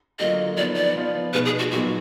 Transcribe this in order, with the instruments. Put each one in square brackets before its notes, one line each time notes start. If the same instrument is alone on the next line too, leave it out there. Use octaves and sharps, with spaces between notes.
[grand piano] D3 F#3 A#3 F4 [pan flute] D#5
[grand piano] F3 B3 D#4 [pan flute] D5
[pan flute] D5
[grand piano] F3 B3 F4
[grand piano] B2 G#3 D#4 [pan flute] B4
[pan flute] G#4
F#4
[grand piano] A#2 F#3 B3 D#4 [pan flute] F#4